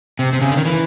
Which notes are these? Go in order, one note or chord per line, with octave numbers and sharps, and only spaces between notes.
C3
C3
C#3
D3
D#3
E3